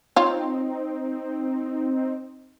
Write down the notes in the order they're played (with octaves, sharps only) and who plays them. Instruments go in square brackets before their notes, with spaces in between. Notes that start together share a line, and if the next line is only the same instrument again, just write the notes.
[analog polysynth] C4 D#4 [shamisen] F4 C#5